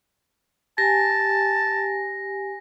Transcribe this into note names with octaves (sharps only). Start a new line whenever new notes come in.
G4 G#5 A5 A#6